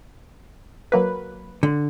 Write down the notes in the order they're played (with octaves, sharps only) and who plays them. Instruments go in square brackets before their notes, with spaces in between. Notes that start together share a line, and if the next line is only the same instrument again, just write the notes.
[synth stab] F#3 A#3 B4
[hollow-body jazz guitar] D3